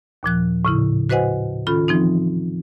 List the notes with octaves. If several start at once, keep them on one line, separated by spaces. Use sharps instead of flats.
D#2 A#2 F3 F#6
A2 C#3 E4
F#4 B4 C5 D#5 F#5 G#5
D#3 C#4 F4 A4 B5
E3 F3 C4 D#4